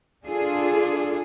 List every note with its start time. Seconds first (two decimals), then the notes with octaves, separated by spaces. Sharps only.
0.25 D4 F4 G#4 A4